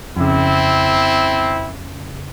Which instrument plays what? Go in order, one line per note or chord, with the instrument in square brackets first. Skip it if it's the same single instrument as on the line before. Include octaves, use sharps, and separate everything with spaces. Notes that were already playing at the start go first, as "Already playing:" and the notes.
[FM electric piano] F2 C#3 [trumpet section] C4 E4